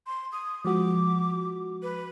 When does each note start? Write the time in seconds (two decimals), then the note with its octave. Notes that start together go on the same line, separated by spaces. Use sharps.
0.06 C6
0.32 D#6
0.65 F3 G#3 F#4 D6
1.82 B4